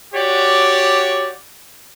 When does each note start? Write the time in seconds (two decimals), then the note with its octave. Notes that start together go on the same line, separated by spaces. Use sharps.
0.13 F#4 G4 C#5 D5